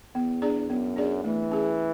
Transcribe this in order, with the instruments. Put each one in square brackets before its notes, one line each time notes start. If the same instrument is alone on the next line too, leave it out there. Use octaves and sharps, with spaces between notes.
[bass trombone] E2 [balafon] B3
[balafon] D4 G#4 D5
[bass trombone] F#2 [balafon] B3
[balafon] D4 G#4 D5
[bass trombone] E3 [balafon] A3
[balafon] C#4 G#4